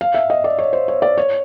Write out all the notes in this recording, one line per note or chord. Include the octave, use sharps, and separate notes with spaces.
F5
E5
D#5
D5
C#5
C5
C#5
D5
C#5